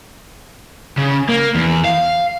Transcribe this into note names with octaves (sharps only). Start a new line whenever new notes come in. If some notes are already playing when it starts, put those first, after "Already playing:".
C#3
A#3
E2
F5